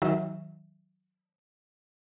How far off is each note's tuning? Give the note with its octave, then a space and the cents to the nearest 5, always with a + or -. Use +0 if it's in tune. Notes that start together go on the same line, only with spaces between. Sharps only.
D#3 +30 F#3 +0 E5 +0